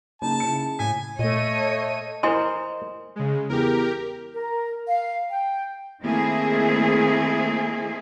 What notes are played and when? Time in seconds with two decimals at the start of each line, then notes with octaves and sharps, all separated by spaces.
0.22 C#3 A#3 D#4 A5
0.40 C#3 E4 C#7
0.79 A2 G#5 B6
1.19 A#2 A3 C#5 D#5 D#7
2.23 E4 A#4 C5 D#5 G#5 C6
3.16 C#3 G#3
3.49 E2 G4 A#4
4.35 A#4
4.88 F5
5.30 G5
6.03 D#3 A3 A#3 C4 E4 G#4